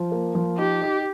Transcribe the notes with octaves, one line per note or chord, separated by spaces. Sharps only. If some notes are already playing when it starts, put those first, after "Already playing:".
Already playing: F3
A#3
F3
D#4 G4
D#4